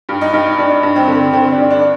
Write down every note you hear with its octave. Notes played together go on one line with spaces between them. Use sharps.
G2
D#4
G2
G2 D4
G2
C4
D3
D3 C4
D4
G2
D4